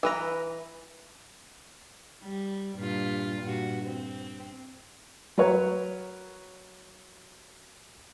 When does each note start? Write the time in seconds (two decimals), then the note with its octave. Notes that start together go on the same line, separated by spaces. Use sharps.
0.03 E3 B4 A#5
2.23 G3
2.76 G2 A#2 F4
3.41 G2 A#2 F#4
3.85 C4
5.38 F#3 A#4 B4 C#5